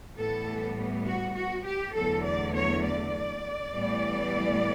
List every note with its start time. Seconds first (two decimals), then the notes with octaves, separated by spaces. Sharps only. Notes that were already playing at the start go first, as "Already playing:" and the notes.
0.17 A2 E3 G3 B3 A4
1.06 F#4
1.36 F#4
1.65 G4
1.95 E2 D3 F#3 A3 A4
2.25 D5
2.55 C#5
2.84 D5
3.73 A2 E3 G3 B3